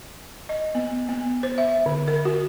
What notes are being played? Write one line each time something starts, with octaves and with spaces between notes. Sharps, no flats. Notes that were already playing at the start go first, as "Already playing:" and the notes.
D#5
B3
B3
C5
E5
D3
A#4
F#4